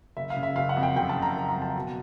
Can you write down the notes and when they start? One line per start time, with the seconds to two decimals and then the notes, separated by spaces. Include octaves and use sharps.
0.17 F#1 E5
0.30 F5
0.37 C#3
0.43 E5
0.56 F#1 F5
0.69 F#5
0.77 F2
0.83 G5
0.96 F#1 G5
1.09 A5
1.16 C#3
1.22 A#5
1.35 F#1
1.49 A#5
1.56 F2
1.62 A5
1.76 B2